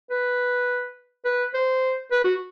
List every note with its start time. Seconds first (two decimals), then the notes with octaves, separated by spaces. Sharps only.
0.10 B4
1.25 B4
1.54 C5
2.11 B4
2.25 F#4